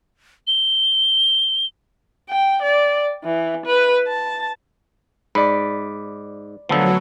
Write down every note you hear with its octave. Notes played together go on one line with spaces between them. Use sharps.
G7
G5
D5
E3
B4
A5
G#2 D5 B5
D2 D3 F3 F#3 B3 A4